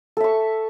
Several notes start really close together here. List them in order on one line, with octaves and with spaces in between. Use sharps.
A4 E5 C#6